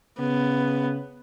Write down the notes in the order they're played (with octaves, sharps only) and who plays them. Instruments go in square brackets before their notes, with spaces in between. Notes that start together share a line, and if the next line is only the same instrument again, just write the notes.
[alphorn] C#3 [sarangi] B3